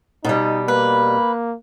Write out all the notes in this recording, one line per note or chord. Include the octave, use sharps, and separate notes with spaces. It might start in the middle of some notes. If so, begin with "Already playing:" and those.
B2 G3 D#4
A#3 B4